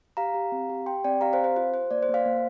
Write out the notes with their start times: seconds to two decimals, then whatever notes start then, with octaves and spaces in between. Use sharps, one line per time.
0.17 G4 F5 A#5
0.34 G4
0.52 C4
0.70 G4
0.86 G4 G5 C6
1.04 C4 D5 G5
1.21 G4 F5 A#5
1.33 C5 F5
1.39 C4
1.44 C5
1.56 F4 C5
1.74 F4 C5
1.91 A#3 D5
2.03 C5
2.09 A#3
2.14 C5 F5
2.26 A#3